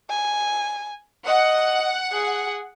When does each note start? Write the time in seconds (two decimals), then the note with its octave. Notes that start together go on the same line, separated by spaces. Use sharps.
0.10 G#5
1.26 D#5 F#5
2.13 G#4